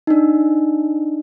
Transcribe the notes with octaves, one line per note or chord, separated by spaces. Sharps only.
D4 D#4